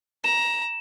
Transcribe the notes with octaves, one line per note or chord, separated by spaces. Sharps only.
A#5 E7